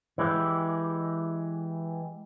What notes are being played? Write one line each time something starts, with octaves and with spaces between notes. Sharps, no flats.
E3 G#3 E4 G4